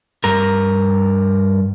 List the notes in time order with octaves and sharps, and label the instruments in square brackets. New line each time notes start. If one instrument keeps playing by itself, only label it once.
[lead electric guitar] G2 A#4